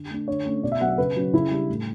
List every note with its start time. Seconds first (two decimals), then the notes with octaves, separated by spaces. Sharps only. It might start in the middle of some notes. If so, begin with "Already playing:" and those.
Already playing: D3
0.10 A3 D4
0.28 D3 C#5
0.45 A3 C#4
0.63 B2 D5
0.72 E5
0.81 F#3 B3 D4 F#5
0.89 E5
0.98 C#3 B4
1.16 F#3 C#4
1.33 C#3 E4
1.51 G3 D4
1.69 A2